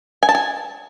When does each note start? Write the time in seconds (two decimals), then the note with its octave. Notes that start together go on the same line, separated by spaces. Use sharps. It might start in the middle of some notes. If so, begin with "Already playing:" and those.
0.23 G#5
0.29 A5
0.35 G#5